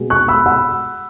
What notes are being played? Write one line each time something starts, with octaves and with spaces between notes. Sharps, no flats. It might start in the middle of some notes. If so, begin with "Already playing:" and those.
Already playing: B2 G#3 B3
C#6 F#6
B5 E6
F#5 B5